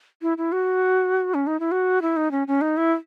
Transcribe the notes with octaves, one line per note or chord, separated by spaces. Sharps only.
E4
E4
F#4
C#4
D#4
E4
F#4
E4
D#4
C#4
C#4
D#4
E4